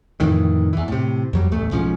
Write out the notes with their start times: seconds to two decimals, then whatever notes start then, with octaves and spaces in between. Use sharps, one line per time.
0.20 F2 A2 D#3 E3
0.73 E2 E3
0.88 A2 C3
1.33 F2 F#3 G3
1.51 D1 A1 E2 A3
1.71 B1 G#2 F3 C#4